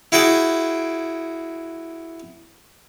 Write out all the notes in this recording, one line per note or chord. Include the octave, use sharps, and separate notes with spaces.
E4 F#4 G#4 G5 D6